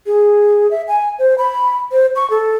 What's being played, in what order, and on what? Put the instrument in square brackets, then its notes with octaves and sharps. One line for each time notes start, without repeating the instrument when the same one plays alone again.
[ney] G#4
E5
G#5
C5
B5
C5
C#6
A4